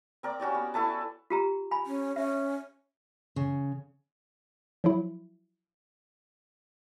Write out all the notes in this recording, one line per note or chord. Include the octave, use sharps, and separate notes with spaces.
C4 A#4 D5 D6
C#4 F#4 G4 D5
B3
E4 A4 B4 A5
F4 G4 A#5
G#5 B5
C#4
C#4 E5
C#3
F3 F#3 E4